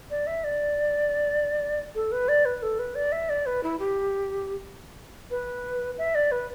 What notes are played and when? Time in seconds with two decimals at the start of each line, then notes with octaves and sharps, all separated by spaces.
0.10 D5
0.27 E5
0.44 D5
1.95 A4
2.12 B4
2.28 D5
2.45 B4
2.62 A4
2.79 B4
2.95 D5
3.12 E5
3.29 D5
3.46 B4
3.63 E4
3.79 G4
5.31 B4
5.98 E5
6.15 D5
6.31 B4